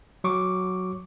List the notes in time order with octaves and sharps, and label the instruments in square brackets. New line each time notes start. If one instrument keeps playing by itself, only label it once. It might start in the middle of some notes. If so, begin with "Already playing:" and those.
[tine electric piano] F#3 C#6 D6